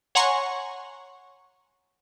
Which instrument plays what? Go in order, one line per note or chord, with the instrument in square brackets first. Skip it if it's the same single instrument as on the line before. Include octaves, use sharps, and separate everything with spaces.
[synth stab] C#5 F#5 G#5 A#5 C6 C#6